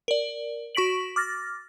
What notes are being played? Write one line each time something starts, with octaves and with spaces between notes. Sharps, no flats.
A#4 D5
F#4 C#6 B6 D7 F#7
D6 F6 A6 A#6